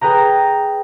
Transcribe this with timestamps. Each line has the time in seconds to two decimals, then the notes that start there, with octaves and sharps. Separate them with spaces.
0.01 G#4 B4 G5 A#5